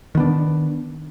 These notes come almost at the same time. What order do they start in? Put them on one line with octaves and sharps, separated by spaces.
D#3 B3 D4